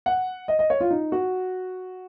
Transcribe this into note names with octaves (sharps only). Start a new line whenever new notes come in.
F#5
D#5
D#5
C#5
F4
D#4
F#4